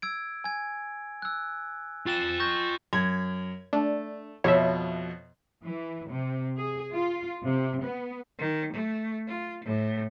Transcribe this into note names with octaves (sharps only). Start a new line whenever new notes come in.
E6 G#6 D7
G#5 G#6
E6 F#6
F4 G5 A6 E7
C#6 G6 A#6
F#2 G#6
A3 D4
F2 B2 C#5 E5
E3
C3
G#4
F4
C3
B3
D#3
A3
F4
A2